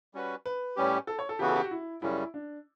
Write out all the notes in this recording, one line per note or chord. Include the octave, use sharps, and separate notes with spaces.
G3 C#4 F#4 B4
B4
A2 G3 C#4 G4
A4
C#5
A4
C#3 E3 B3 F#4 G4
A4
G4
F#4
E4
F#2 C#3 G3 C#4 E4
D4